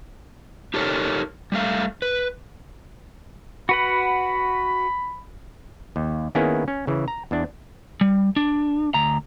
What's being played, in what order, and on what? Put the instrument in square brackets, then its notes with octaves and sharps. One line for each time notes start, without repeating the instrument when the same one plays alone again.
[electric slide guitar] D#4 G4 A4 A#4 C#5
G3 A3 F5
B4
[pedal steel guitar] F#4 B4 F#5 [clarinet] B5
[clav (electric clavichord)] D#2
D#3 A#3 B3 C#4 E4 G#4
C#4
C#3 E3
A#5
E2 D4
[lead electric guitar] G3
D4
D2 A#5